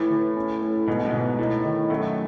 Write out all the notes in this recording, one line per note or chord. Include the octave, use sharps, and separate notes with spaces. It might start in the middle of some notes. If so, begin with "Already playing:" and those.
Already playing: A2 E3
E3
C#4
A3
G#2 B2
F#2
G#2 B2
A2 D#4
D#3
F#2 A3